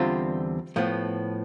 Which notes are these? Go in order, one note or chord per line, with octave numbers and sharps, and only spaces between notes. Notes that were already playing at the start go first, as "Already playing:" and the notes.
Already playing: E2 D3 G3 C4 F4
A2 F3 B3